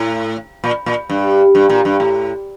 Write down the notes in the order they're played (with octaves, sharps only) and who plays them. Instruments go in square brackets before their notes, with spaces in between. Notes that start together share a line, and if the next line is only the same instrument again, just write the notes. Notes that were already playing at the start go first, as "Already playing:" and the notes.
Already playing: [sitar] A2
A#2
A#2
G2
G2
A#2
G2
A2